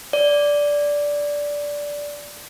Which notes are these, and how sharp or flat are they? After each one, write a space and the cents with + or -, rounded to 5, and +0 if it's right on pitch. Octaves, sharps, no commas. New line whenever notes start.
D5 -10